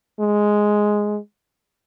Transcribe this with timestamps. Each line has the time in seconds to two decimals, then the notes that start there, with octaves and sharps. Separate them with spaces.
0.20 G#3